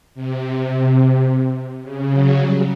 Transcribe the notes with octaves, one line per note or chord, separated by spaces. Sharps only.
C3
C#3
F#3
G3